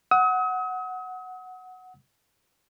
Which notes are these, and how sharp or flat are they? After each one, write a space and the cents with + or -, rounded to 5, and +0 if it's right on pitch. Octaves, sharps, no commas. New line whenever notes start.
F#5 +0 D#6 +40